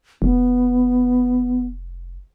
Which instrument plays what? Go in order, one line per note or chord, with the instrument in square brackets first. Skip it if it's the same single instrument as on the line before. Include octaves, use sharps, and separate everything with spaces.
[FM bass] F1 [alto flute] B3